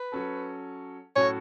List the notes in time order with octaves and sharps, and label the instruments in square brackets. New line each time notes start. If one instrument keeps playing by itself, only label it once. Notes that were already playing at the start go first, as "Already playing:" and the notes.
Already playing: [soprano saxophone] B4
[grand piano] F#3 C#4 A4
[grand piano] A2 F#3 C#4 F#4 A4 [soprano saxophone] C#5